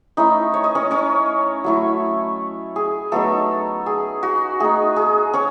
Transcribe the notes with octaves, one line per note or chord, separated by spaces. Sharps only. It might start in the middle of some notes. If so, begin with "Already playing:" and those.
A3 C#4 D#4 E4 D#5
C#5
D#5
C#4 C#5
C#4 C#5
F#3 A3 E4
G#4
F#3 A3 B3 D#4 A4
G#4
F#4
A3 D#4 G#4
G#4
C#4 C#5